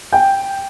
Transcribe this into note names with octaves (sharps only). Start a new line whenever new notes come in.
G5